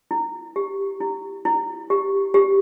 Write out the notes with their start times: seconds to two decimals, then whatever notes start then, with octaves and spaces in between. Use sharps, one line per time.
0.11 E4
0.56 G4
1.01 E4
1.45 E4
1.90 G4
2.34 G4